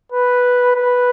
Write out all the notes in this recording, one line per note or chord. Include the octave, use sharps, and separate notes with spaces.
B4
B4